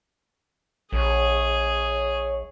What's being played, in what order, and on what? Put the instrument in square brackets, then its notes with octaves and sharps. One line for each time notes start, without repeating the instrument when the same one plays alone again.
[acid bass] A#1 [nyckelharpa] G#4 [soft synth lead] C#5